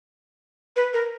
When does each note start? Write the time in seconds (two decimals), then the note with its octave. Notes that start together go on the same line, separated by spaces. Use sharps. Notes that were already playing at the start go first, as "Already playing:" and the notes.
0.76 B4
0.93 A#4